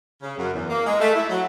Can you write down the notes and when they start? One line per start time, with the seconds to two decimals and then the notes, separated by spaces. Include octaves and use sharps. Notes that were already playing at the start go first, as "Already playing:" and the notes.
0.22 C#3
0.38 F#2
0.54 E2
0.69 A#3
0.86 G#3
1.01 A3
1.15 E4
1.29 F#3